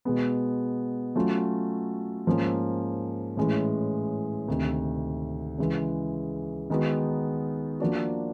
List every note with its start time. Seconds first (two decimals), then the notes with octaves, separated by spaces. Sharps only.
0.05 B2 G#3 B3
1.16 F#3 A3 C#4 F4
2.27 G#2 F3 A#3 C#4
3.37 A2 E3 G#3 C#4
4.48 D2 C3 D#3
5.58 C#3 E3 G#3
6.70 D#3 G#3 B3 D#4 F#4
7.80 F3 A#3 D4 F#4